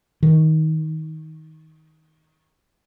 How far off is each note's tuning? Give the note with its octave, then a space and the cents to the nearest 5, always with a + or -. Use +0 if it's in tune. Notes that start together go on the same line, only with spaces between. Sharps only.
D#3 +20